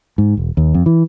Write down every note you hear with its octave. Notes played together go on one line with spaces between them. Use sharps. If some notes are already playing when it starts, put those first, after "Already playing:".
G#2
E1
D#2
F2
E3